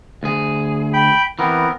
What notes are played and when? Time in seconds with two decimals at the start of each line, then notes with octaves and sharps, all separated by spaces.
0.23 D2 G#4
0.94 G5 B5
1.39 E3 B3 C4 A#4